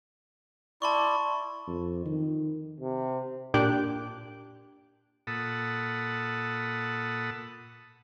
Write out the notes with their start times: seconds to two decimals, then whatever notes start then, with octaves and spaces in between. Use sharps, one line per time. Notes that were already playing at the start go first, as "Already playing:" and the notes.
0.82 E4 D5 A5 C6 C#6
1.67 F2
2.06 D#3
2.80 C3
3.54 A#2 D4 G4 G5 F#6 D7
5.27 A#2 A4 F#5 A5 B5 D#6